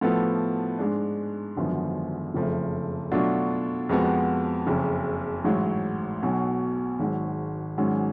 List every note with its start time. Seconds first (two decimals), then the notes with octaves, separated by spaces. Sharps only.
0.01 A2 F3 B3 F#4 A4
0.79 G#2 G#3 D4
1.57 G#1 F#2 D3 F3 B3
2.34 F#1 F2 C#3 F3 A3
3.11 B2 F#3 A3 D4 F4
3.89 F2 F3 G#3 B3 F#4
4.67 F#1 F2 C#3
5.44 A1 G#2 F#3
6.22 B1 B2 F#3
7.00 G#1 G#2 F#3
7.78 G#1 G#2 F#3 C#4